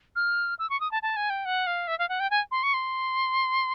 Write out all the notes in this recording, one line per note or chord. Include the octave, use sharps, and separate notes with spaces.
F6
E6
C#6
D#6
A5
A5
G#5
G5
F#5
F5
E5
F5
F#5
G5
G#5
C6
C#6
C6